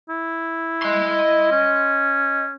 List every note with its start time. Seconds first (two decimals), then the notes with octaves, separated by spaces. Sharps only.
0.09 E4
0.83 D#5 C6
1.52 C#4